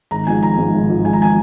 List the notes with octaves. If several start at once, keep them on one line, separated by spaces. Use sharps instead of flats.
G#1 A#5
G#2 F3 G#5
G#1 A#5
G#2 F3
G#1
G#2 F3
G#1 G#5
A#5
G#5
F3